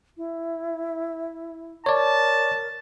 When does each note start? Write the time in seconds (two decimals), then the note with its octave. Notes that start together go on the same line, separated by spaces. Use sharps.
0.17 E4
1.86 A#4 C#5 D5 A5